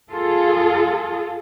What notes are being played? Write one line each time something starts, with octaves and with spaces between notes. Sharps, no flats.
F4 G#4 A4